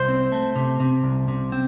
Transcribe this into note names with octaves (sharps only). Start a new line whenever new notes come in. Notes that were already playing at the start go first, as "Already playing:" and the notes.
Already playing: C2 C5
C4
A3
C3
C3
C2
C3
C4